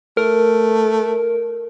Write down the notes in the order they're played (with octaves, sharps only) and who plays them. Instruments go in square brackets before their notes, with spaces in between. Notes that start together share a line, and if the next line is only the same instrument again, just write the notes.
[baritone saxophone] A3 [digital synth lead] A#4